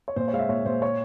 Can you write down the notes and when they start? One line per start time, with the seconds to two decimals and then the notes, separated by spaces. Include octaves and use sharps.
0.08 C#5
0.16 A#2 C5
0.28 C#5
0.33 G#3 F5
0.39 E5
0.49 A#2 C#5
0.65 A#2 C5
0.82 C#5